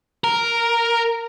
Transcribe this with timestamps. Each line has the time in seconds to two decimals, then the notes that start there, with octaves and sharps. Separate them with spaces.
0.24 A#4